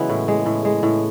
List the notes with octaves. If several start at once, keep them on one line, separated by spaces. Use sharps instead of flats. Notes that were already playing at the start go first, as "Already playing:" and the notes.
Already playing: C#3 E3 F#3 G#3 B3
A2
G#3
A2
G#3
A2